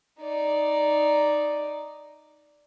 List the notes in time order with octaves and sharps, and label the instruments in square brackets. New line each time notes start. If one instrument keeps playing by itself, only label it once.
[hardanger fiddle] D#4 D5